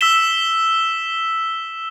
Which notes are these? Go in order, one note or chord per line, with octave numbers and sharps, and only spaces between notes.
E6 B6 E7 G7